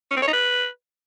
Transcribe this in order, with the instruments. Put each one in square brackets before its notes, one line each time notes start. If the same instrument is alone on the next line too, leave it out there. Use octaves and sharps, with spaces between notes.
[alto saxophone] C#4
C4
C#5
D#4
B4